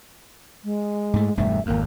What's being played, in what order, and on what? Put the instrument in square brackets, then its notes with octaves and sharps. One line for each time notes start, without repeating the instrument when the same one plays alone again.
[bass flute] G#3
[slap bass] G#2 A3
[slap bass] E1 G2 A3 [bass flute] E5
[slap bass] G#1 F2 [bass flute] A#3